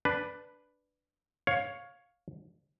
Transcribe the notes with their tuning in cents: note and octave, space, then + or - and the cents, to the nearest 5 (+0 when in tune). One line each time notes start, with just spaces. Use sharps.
D4 +0 B4 +0
C#5 +0 F5 +15